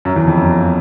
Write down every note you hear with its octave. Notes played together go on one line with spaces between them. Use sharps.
F#2
E2
F2
F#2